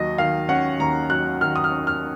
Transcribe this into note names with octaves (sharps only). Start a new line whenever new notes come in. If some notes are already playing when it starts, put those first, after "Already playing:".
Already playing: D#2 F#3 D#5
D#3 F5
C#4 F#5
D#2 A#5
F#3 F#6
D#3 F6
D#6
F6
C#4
F6